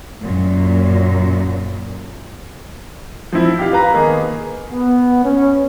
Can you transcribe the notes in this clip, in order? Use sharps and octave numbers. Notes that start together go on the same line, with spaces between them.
F#2 A#2
F3 C4 E4
G4 F5
B4 A#5
D#3 A#3 B3 G#4
B3
C#4